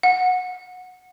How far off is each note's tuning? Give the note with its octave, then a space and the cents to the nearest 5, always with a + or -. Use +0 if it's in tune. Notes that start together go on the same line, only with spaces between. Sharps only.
F#5 -15